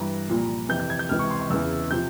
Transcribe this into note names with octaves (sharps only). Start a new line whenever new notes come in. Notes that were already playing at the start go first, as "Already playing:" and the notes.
Already playing: G2 E3 A#5
C2 A#2 F3
F2 C3 E3 G6
G6
G#6
G6
C#2 C3 E3 F6
C#6
C6
C#6
E2 C#3 E3 E6
C3 F3 G6